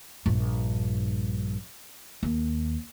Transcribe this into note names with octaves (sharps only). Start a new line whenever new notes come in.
A#1 G2
D#2